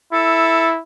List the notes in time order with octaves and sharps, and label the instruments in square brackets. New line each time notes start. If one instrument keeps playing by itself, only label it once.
[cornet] E4 [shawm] A4